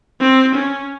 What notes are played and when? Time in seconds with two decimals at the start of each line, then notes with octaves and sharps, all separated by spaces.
0.20 C4
0.55 C#4